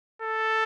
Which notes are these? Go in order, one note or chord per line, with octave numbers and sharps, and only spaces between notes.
A4